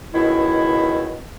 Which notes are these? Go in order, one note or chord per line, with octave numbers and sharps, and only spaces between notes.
C#2 B2 D#3 E4